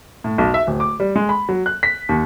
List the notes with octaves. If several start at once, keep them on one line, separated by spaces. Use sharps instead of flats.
A2
B1
E5
D1
D6
G3
G#3
B5
F#3
F#6
B6
D#2